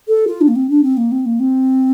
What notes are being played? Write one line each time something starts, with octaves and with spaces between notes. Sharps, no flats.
A4
F4
D4
A#3
C4
D4
C4
A#3
C4
A#3
C4